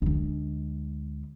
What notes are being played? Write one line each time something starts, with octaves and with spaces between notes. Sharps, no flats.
D2 G#3